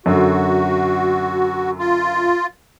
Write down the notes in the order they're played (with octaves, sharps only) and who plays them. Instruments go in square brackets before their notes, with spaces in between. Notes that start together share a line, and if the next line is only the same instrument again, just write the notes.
[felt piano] F#2 D3 [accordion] F#4
[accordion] F4